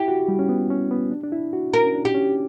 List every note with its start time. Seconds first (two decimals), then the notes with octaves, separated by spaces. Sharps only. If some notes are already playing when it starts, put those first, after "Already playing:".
Already playing: E4 G4
0.08 F#4
0.28 G3
0.39 C#4
0.49 B3
0.70 C#4
0.91 B3
1.11 D4
1.24 D4
1.32 E4
1.53 F#4
1.73 A#4
1.84 C#4
1.94 D4
2.05 G4
2.14 C#4